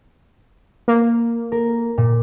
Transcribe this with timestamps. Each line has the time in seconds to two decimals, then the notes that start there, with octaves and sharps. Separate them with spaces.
0.88 A#3
1.52 A#4
1.98 A#2